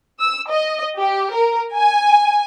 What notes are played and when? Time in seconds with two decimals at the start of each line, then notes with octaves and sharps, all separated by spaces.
0.21 E6
0.50 D#5
0.97 G4
1.33 A#4
1.75 G#5